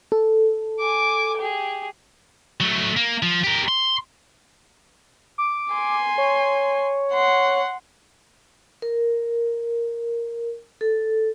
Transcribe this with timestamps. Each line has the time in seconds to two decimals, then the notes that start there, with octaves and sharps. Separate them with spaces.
0.12 A4
0.79 G#5 D6
1.37 G4 G#4
2.60 F#3 A3
2.97 A#3
3.23 F3
3.44 G4 A#4
3.68 C6
5.38 D6
5.74 G#5 C6
6.18 C#5
7.13 F#5 C6
8.82 A#4
10.81 A4